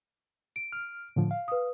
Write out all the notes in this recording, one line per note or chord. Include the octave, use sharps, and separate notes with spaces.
D7
F6
A2 D3 F3
F5
B4 D#6